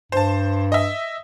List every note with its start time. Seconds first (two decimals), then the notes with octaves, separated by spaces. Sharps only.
0.12 G2 C5 A5
0.72 D#5 E5